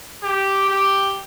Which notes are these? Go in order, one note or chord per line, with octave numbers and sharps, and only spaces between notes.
G4
G4